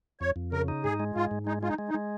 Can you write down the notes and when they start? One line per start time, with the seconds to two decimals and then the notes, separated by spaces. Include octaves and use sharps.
0.21 F2 C#5
0.36 F2
0.52 C#3 A#4
0.68 D#4
0.84 G#2 G#4
1.00 G#3
1.16 G#2 F4
1.31 G#2
1.47 G#3 D#4
1.63 G#3 F4
1.68 D#4
1.78 G#3
1.89 D#4
1.94 G#3